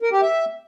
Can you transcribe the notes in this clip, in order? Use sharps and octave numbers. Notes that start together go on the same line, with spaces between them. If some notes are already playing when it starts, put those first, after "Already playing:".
A#4
G4
E5